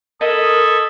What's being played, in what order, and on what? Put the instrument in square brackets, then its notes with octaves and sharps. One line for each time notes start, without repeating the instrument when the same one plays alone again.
[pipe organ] A4 B5 G#6 [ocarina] A#4 [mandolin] D#5 [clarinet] D#6